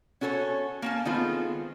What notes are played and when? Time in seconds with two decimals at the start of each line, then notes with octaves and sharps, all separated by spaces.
0.21 C#4 F#4 A4 C5 C#5
0.82 A#3 C#4 A5
1.05 D#3 G#3 B3 C4 F4 A4